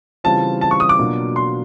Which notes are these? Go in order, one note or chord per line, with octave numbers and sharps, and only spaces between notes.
C#3 E3 G3 C4 F4 A5
A5
C#6
D#6
D6
B2 F#3 A#3 D4 F4
C6